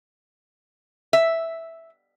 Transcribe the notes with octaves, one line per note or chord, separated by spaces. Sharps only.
E5